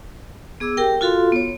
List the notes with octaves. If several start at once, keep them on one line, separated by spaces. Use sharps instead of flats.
B3 G#4 D6 E6
G4 A#4 G5
F4 F#4 A4 F5 C6
B3 C#5